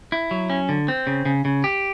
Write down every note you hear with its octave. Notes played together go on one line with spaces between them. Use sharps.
E4
F#3
C#4
D3
C4
C#3
C#3
C#3
G4